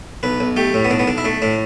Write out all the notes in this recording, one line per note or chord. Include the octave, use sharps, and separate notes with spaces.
B1 B4
B1
A3 G4
A2
B3
B1 D4
B3
B1 D4
E4
A3 D4
A2 D4